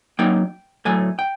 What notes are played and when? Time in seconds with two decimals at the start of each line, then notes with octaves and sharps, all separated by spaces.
0.19 F#3 A#3 D#4 G5
0.85 A2 F#3 A3 G#5
1.19 G5